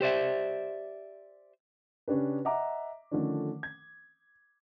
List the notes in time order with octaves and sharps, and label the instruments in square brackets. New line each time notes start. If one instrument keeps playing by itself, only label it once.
[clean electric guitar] G4 C5 D5 E5
[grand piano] C#3 C#4 D4 G4 B4
D#5 E5 F#5 A#5 D6
D3 D#3 F3 A3 C#4 D4
G#6